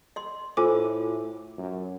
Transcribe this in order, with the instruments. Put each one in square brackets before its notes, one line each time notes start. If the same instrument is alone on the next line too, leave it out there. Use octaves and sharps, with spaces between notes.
[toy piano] D#5 C6
[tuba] A2 [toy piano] F4 C5 [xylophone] A4 G#5 D6
[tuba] F#2